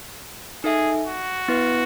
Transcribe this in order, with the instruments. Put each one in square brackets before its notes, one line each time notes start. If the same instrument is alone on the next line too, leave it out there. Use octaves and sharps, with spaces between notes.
[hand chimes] D#4 A4 E5 G#5 [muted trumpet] G#4
[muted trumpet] F#4
[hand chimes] B3 E4 B4